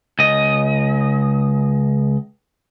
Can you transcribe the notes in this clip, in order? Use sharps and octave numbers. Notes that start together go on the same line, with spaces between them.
C#2 D#5